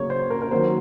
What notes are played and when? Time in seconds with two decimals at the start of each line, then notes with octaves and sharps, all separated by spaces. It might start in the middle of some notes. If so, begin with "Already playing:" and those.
Already playing: C#3 F#3 A#3 C#5
0.10 C5
0.30 A#4
0.42 A#4
0.51 D#3 F#3 A#3 C5